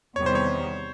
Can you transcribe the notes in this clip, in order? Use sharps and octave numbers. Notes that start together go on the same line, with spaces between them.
E2 C3 D#3 G3 B3 C#5
C5
C#5